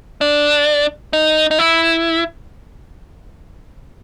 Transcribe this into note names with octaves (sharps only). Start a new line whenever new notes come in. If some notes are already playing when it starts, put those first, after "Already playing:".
D4
D#4
D#4
E4